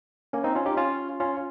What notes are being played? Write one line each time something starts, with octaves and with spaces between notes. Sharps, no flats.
A#3 C#4
C4 D#4
C#4 F4
D#4 G4
C#4 F4
C#4 F4